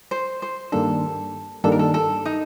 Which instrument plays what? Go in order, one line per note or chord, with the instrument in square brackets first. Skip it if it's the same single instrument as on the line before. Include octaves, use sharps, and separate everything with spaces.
[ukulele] C5
C5
[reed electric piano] G2 D#3 G3 A#3 D4 [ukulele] A4
[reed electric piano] G2 D#3 G3 A#3 D4 [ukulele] A4
[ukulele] A#4
A4
A4
D#4